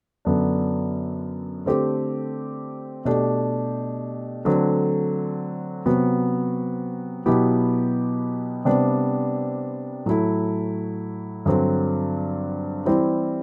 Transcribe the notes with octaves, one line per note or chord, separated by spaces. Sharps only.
F#2 D3 F#3 B3 D4
D3 A3 C4 G4
B2 A3 D4 G4
D3 F#3 A3 C4
C3 F#3 B3 F#4
B2 F#3 B3 E4 G4
C3 G3 B3 D4
A2 F#3 A3 E4
G2 D3 F#3 C4
E3 G3 C4 E4 G4